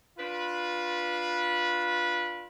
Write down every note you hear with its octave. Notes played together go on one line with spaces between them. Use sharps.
D4 F4 B4